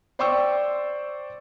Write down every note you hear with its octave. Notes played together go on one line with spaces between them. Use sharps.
C5 D5 G5 C6 C#6 E6